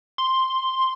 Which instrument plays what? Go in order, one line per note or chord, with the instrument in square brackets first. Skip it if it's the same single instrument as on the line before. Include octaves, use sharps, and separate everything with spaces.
[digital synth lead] C6